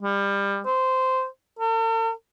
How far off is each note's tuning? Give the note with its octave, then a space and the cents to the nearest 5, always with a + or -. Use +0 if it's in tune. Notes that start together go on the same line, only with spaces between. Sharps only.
G3 +25
C5 -10
A4 +45